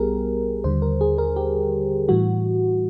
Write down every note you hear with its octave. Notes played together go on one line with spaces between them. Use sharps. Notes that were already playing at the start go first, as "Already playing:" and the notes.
Already playing: B1 G3 B3 G4 G#4 A#4
D#2 D3 G3 C5
A#4
G#4
A#4
G4
A2 E3 G3 F#4